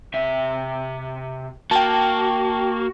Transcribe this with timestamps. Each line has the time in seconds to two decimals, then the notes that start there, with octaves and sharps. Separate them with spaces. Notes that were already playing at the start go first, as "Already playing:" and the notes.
0.14 C3 E5
1.71 A#3 F#4 G5 A5